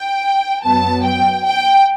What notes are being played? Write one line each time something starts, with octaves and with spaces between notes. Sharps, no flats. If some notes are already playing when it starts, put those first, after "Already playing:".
Already playing: G5
F#2 F#3 B3 A5
G5
G5